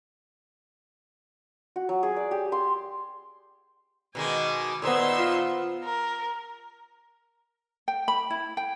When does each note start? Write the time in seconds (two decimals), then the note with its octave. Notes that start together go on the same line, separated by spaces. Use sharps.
1.76 F#4
1.89 F#3
2.03 G#4
2.16 D5
2.31 G4
2.52 C6
4.15 B2 D#3 G#3 G#5 D6
4.82 A#2 D#3 B3 C5 D#5 E5 C6 E6
5.19 F4
5.84 A#4
7.88 G5
8.08 B5
8.30 E4
8.57 G5